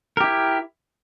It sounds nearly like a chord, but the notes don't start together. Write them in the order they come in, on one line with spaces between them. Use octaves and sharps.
A#4 G4 E4